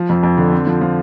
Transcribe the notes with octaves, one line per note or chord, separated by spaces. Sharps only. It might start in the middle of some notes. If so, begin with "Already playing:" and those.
Already playing: F3
F2
F2
D3
C4
F3
F3